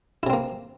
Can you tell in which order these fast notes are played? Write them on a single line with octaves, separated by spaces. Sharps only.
E4 C3 C4 A#3